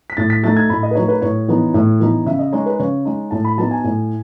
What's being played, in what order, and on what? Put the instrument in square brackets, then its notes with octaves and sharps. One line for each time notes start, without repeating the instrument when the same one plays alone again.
[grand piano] B6
A2 A6
B6
F#3 A3 D#4 A6
G#6
A2 B5
D#5
B4
F#3 A3 D#4 C#5
B4
A2 C#5
E3 B3 D#4
A2
E3 B3 D#4
C#3 E5
D#5
G#3 D#4 C#5
B4
C#3 C#5
G#3 D#4
A2 A5
B5
F#3 B3 D#4 A5
G#5
A2